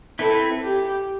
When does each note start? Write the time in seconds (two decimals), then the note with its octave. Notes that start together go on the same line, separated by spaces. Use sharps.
0.19 C4 E4 A4 B4
0.63 G4